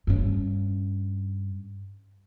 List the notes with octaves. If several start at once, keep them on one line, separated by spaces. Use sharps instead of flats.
G2 C#4